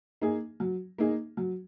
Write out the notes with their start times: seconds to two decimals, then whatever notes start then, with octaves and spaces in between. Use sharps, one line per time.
0.21 A#3 D#4 G#4
0.60 F#3
0.98 A#3 D#4 G#4
1.37 F#3